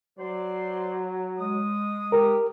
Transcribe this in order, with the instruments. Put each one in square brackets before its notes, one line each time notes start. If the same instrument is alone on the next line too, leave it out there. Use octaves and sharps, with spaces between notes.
[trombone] F#3 [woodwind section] C5 D5 C6
[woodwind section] G#3 D#6
[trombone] G4 [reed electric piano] A#4